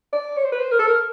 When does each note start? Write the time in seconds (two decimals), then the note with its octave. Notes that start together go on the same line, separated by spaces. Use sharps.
0.13 D5
0.37 C#5
0.44 C5
0.52 B4
0.59 C5
0.72 A#4
0.79 A4
0.87 A#4